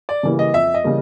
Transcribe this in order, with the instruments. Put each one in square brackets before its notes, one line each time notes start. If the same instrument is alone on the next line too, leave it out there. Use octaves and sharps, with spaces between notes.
[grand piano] D5
[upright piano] C#3 E3 G3 A#3
[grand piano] D#5
[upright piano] F2 [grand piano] E5
[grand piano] D#5
[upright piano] C#3 E3 G3 A#3